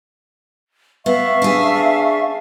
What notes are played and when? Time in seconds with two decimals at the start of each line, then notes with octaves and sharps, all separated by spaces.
1.06 B3 E5 F5 C#6
1.42 D4 G#4